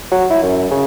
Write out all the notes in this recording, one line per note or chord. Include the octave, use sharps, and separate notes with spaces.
F#3
E4
F#2
C#3